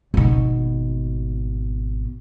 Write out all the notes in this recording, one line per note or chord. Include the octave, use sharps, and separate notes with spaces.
G#1 B2